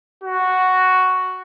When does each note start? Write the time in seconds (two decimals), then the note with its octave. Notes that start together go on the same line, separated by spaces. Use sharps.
0.24 F#4